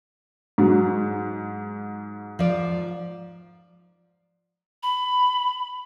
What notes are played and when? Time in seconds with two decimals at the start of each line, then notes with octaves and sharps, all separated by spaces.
0.58 G#2 F#3
2.39 F3 D5
4.83 B5